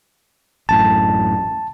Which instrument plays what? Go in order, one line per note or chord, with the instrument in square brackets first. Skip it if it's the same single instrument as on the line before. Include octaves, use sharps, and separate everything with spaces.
[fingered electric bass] A1 F#2 A2 [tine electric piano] A5